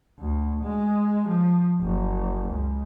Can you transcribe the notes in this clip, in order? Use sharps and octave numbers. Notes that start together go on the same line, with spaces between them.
D2
G#3
F3
F#1
C#2